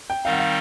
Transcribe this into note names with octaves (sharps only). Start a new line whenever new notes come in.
G5
D#3 G3 C4 D#4 F5
F#5
F5